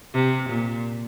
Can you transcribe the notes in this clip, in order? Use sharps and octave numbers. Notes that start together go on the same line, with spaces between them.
C3
A#2